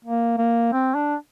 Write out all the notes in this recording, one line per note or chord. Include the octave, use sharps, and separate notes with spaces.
A#3
A#3
C4
D4